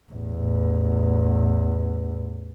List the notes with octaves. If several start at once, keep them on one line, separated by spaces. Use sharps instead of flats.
A1 E2